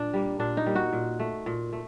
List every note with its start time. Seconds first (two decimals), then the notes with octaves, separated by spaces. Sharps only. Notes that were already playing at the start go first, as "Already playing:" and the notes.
Already playing: A#2 D4
0.13 G3 A#3
0.39 A#2 D4
0.57 D#4
0.66 G3 A#3
0.75 F#4
0.93 A#2
1.19 A3
1.46 A#2
1.73 A3